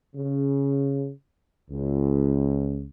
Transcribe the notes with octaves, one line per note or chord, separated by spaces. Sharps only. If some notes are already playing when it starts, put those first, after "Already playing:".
C#3
C#2